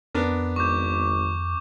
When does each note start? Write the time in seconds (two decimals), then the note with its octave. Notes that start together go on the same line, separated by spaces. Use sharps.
0.14 F2 B3 D4 A#4
0.56 G#1 C#6 D6 G6